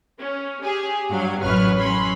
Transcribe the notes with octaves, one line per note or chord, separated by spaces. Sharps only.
C#4
G4 G#4 G#5
G2 F#3 F5
A1 F#2 B4 C#5 F6
F#3 C#4 B5 C6